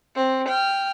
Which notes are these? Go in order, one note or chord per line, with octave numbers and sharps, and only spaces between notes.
C4
G5 F6